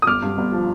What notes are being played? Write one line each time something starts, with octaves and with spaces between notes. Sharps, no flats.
D#6
G1 D6 F6
G2
G1
F3